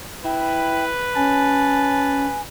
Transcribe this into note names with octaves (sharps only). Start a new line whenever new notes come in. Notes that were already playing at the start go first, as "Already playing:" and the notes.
E4 B4 G5
C#4 G#5 A5